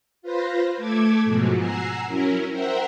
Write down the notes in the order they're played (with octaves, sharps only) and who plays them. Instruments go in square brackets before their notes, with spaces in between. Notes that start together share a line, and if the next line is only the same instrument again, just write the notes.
[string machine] F4 B4 C5 A#6
A3 A4 D6 G#6
G#2 B2 F3 F#3
F#5 G#5 A#5 E6 C7
F#3 C#4 E4 A#4
A#4 C5 E5 F#5 G5